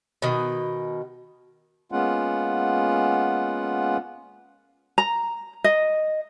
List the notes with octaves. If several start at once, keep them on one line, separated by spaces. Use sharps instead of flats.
B2 D#3
G#3 A#3 B3 C#4 F4 F#5
A#5
D#5